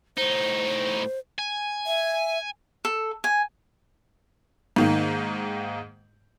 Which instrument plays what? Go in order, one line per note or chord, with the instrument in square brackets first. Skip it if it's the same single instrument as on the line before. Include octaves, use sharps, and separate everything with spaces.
[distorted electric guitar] A2 D#4 [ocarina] C5
[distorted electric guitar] G#5
[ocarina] E5
[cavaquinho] A4
G#5
[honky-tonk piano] G#2 D#3 A#3